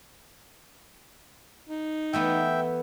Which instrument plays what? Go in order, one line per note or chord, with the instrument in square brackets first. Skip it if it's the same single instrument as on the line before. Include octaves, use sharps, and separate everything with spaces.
[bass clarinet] D#4
[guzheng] E3 A3 B3 [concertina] E5 G5